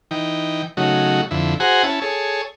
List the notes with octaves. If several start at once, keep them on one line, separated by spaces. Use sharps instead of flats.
E3 D#4 G5
C#3 F#3 A3 D#4 F#4
F2 D3 E4
F#4 G#4 C5 F#5 G#5 A#5
C#4 E4 A5
G#4 A4 C#5